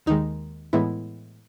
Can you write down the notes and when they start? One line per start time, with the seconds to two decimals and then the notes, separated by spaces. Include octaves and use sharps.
0.06 D#2 D#3 G#3 D#4
0.73 A2 E3 G#3 B3 E4